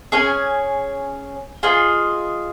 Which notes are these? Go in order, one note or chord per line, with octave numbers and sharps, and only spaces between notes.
C#4 G#4 C#5 G#5
F4 G#4 D#5